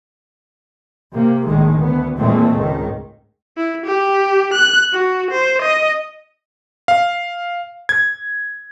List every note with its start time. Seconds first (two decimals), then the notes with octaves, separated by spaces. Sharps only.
1.14 C3 A#3
1.47 A#1 A2 D#3 G#3
1.78 D2 B3
2.18 A#2 E3 G#3 A3 C4
2.55 C#2 G#2 D#3
3.57 E4
3.86 G4
4.54 F#6
4.93 F#4
5.31 C5
5.62 D#5
6.88 F5
7.89 G#6